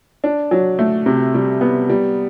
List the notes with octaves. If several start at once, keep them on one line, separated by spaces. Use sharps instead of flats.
D4
F#3
A3
C3
G3
B3
G3